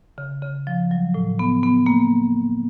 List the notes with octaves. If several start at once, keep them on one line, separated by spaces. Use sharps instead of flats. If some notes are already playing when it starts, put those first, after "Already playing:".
C#3
C#3
F3
F#3
A2
B3
B3
A#3